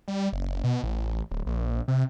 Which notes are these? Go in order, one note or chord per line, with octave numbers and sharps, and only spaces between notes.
G3
F#1
B2
A1
D1
A#1
C3